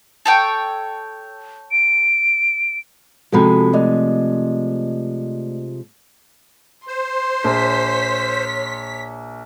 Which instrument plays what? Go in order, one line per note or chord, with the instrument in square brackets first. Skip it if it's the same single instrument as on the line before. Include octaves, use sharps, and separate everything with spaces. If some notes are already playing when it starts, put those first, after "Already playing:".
[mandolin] A4 C#5 G5
[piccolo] D7
[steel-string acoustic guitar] C3 F3 G#3 [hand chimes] F#4 A4 B5
[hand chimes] A3 D5 D#5
[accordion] C5 [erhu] C6
[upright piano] A#1 [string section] C#5 B6